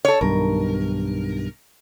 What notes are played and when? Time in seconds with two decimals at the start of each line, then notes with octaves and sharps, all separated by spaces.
0.05 A4 C#5
0.21 B1 G2 D#3 A#4